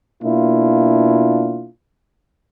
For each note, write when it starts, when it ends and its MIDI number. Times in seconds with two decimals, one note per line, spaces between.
0.23 1.69 47
0.23 1.69 58
0.23 1.69 62
0.23 1.69 64
0.23 1.69 65